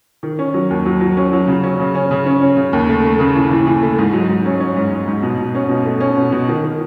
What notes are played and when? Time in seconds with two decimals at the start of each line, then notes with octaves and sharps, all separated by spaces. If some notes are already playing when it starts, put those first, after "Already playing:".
0.23 D#3
0.39 C#4
0.54 F#3
0.70 D#2
0.86 F#3
1.01 F#3
1.17 C#4
1.33 F#3
1.47 C#3
1.63 C#4
1.79 C#3
1.95 C#4
2.11 C#3
2.26 C#4
2.41 C#4
2.57 C#3
2.73 D#2
2.89 A3
3.05 A3
3.19 C#3
3.36 E3
3.51 E3
3.67 E3
3.82 A3
3.98 G#2
4.13 F#3
4.28 G#2
4.45 C#4
4.60 C#4
4.77 G#2
4.92 G#2
5.07 G#2
5.23 B2
5.38 B2
5.55 C#4
5.69 B2
5.85 A3
6.00 C#4
6.17 B2
6.32 B2
6.48 D#3
6.63 D#3